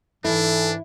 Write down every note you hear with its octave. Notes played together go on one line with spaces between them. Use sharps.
G#2 E3 D4 E4 A4